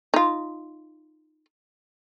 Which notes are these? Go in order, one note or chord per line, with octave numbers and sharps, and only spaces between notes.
D#4 F4